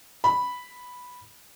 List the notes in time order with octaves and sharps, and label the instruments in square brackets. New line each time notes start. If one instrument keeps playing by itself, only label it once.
[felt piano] B5